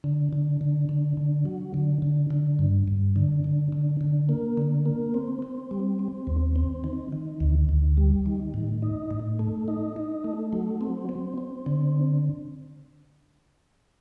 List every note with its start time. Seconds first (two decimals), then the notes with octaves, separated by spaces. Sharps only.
0.04 D3
0.33 D3
0.61 D3
0.89 D3
1.17 D3
1.45 F#3
1.74 D3
2.02 D3
2.30 D3
2.59 G2
2.88 G2
3.16 D3
3.44 D3
3.72 D3
4.01 D3
4.29 A#3
4.57 D3
4.86 A#3
5.14 C4
5.42 C4
5.71 G3
5.99 C4
6.27 D#2
6.56 C4
6.84 D#3
7.12 D#3
7.40 D2
7.69 D2
7.97 G3
8.26 D#3
8.54 A2
8.82 D#4
9.11 A2
9.39 A3
9.68 D#4
9.96 D#4
10.24 A3
10.53 F#3
10.81 C4
11.09 C4
11.38 C4
11.66 D3